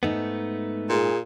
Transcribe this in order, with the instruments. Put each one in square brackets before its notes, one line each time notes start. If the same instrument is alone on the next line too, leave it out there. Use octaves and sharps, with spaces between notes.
[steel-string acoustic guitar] G#2 D#4 [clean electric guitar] A3 B3
[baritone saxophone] A#2 [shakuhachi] G#4